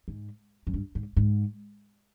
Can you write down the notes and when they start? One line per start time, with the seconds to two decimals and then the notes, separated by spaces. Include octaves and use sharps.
0.08 G#2
0.67 F#2
0.74 G2
0.95 G#2
1.17 G#2